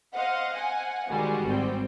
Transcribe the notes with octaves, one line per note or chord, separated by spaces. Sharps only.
C5 D#5 F5 F#5
F#5 G#5
D#3 G3 G#3 F#4 G#4
G#1 C4 G5